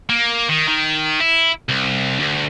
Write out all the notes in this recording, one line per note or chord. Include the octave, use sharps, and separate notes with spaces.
A#3
D#3
D#3
E4
C2
D2